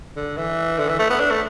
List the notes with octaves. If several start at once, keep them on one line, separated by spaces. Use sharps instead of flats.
D3
E3
D3
E3
A3
B3
D4
A3